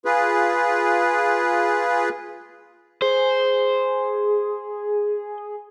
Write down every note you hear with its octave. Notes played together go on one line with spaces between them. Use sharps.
F4 G#4 B4
G#4 C5